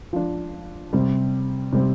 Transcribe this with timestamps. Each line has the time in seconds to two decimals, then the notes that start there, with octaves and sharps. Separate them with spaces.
0.13 F3 D4
0.93 C3 G3 C4
1.73 C3 G3 C4